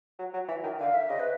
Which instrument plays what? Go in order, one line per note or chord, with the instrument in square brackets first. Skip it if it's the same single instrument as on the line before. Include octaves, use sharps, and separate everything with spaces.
[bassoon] F#3
F#3
E3
D#3
[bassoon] D3 [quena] F5
[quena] E5
[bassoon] C#3 [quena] D#5
[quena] B4